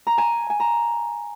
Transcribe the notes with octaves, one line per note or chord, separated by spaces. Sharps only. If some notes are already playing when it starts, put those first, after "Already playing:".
A#5
G#5
G#5
A#5